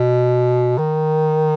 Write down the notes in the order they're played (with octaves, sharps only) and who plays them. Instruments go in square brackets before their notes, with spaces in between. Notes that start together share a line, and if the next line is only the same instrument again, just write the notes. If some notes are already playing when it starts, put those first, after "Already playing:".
Already playing: [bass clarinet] B2
D#3